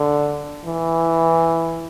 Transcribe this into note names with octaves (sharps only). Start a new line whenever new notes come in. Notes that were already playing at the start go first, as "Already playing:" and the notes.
Already playing: D3
E3